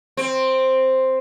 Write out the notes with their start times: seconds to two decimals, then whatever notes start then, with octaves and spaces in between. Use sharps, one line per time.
0.17 C4